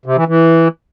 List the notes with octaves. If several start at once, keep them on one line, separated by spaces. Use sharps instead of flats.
C3
E3
E3